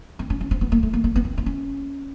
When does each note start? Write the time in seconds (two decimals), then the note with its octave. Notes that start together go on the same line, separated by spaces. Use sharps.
0.19 C4
0.30 C#4
0.41 C#4
0.51 C4
0.61 B3
0.72 A#3
0.83 A3
0.93 A#3
1.04 A#3
1.16 B3
1.25 C4
1.38 C4
1.46 C#4